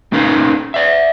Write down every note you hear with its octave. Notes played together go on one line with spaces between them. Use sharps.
A#3 C#4 D#4 A#4 B4 F5
D5 E5